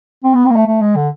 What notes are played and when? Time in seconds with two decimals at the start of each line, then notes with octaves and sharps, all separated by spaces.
0.24 C4
0.34 B3
0.46 C4
0.50 A#3
0.56 A3
0.67 A3
0.81 G#3
0.96 D3